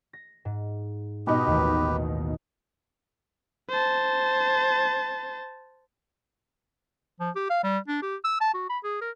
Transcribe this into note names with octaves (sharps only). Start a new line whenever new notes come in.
A#6
G#2
B2 D#4 G4 B4
A1 D#2 A3
C5 A5
F3
G4
F5
G3
D4
G4
E6
A5
F#4
B5
G#4
A#4